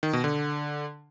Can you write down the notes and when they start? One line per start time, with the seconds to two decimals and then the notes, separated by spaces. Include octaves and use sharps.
0.03 D#3
0.13 B2
0.24 D3